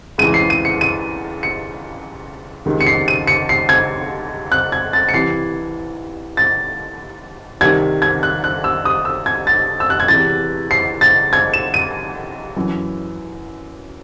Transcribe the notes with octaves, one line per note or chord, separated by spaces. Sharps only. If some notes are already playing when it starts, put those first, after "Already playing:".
C#2 C#3 E3 D#7
C7
D#7
C#7
D#7
C#7
C#2 C3 D#3
C#7
C7
D#7
C#7
C7
G#6
F#6
G#6
A6
C#7
C2 C3 E3 C7
A6
C2 C3 D#3 G#6
G#6
F#6
F#6
E6
D#6
E6
G#6
A6
E6
F#6
G#6
E2 C3 E3 A6
C7
A6
G#6
E7
D#7
F#2 E3